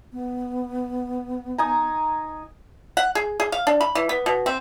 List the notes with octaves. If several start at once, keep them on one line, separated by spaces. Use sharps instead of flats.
B3
D#4 G#5 A#5
F#5
G#4
G#4
F5
D4
B5
E3
B3
B2
C4